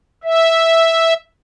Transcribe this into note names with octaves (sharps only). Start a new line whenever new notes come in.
E5